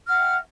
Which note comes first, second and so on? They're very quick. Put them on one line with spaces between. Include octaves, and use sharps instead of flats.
F6 F#5 E5 G5